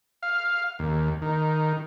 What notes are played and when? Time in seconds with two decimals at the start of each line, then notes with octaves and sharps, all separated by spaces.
0.23 F5
0.79 D#2
1.22 D#3